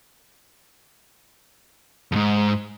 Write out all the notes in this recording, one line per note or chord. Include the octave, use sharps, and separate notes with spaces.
F2 G#2